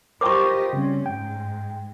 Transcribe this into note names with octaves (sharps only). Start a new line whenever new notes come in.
F4 G4 A#4 C5 D#5 G5 C#6 D6
C#3 G3 C4 C#4
G#2 G#3 G5